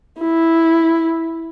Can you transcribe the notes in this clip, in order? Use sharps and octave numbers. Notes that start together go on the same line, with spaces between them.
E4